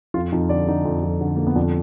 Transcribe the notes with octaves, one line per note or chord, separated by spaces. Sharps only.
F2 F4
F2 D#4
D3 D5
D3 D#4
F2
F2
D3
D3 A#3
B3
F2 D4